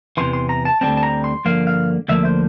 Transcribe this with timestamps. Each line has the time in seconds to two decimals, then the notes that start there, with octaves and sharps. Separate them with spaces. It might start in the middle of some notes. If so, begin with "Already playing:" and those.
0.17 E2 C3 E3 C6
0.33 C6
0.49 A#5
0.65 A5
0.81 D2 D3 G3 C4 A5
0.97 A5
1.03 A#5
1.24 C6
1.45 G2 D3 F3 A#3 F5
1.67 F5
2.08 D2 D3 F3 A#3 E5
2.25 C5